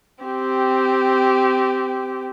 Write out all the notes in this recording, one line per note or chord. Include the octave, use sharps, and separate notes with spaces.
C4 G4